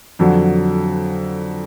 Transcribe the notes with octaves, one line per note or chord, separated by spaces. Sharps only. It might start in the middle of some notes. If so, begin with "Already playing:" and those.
F2 D3 F#3